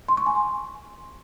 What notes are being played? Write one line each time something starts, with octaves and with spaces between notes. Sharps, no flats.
C6
C#6
G#5
C6